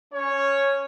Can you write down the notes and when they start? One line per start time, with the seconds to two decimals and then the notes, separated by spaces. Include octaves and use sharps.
0.13 C#4 C#5